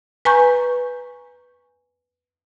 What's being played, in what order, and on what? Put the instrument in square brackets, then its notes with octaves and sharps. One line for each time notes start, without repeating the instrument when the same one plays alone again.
[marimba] B4 G#5 A#5 C#6 G6